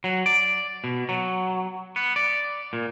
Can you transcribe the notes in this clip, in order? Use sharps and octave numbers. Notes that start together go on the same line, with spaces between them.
F#3
D5
B2
F#3
B3
D5
A#2